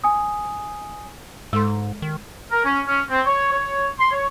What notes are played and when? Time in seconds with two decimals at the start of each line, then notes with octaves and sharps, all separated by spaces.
0.04 G#5 D#6
1.53 G#2 G#3 A4 C6
2.02 D#3
2.51 A#4
2.64 C#4
2.87 C#4
3.10 C4
3.26 C#5
3.52 C#5
3.99 C6
4.11 C#5